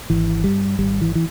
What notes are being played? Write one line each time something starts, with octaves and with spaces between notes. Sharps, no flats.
G#1 E3
G2 G3
G#1 G3
E3
E3